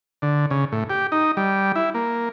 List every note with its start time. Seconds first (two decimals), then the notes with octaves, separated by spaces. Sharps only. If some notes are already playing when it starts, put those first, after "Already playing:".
0.22 D3
0.51 C#3
0.72 A2
0.90 G4
1.12 D#4
1.37 G3
1.75 E4
1.94 A#3